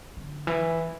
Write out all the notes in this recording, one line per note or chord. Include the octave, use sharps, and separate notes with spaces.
D3
E3